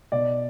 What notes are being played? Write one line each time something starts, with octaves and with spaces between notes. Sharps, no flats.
B2 D5